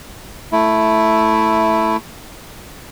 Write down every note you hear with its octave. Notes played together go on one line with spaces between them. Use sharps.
A3 E4